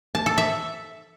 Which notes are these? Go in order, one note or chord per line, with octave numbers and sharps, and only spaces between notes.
A5
A4
E5